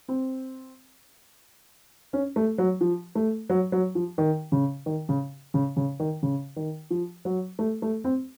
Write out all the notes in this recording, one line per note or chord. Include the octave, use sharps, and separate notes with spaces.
C4
C#4
A3
F#3
F3
A3
F#3
F#3
F3
D#3
C#3
D#3
C#3
C#3
C#3
D#3
C#3
D#3
F3
F#3
A3
A3
C4